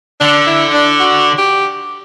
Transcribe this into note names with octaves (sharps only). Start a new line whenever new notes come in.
D3 D4
E4
D4
F#4
G4